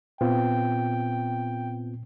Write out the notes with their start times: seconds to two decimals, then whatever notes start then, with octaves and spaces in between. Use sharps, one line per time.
0.21 A#2 B3 C4 F4 G5